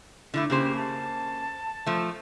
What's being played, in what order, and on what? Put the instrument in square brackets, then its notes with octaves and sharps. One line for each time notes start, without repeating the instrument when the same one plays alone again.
[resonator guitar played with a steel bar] D3 G#3 A3 [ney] E4
[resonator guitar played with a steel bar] C#3 A#3 C5 [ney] G4
[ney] A5
[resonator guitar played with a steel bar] F3 A3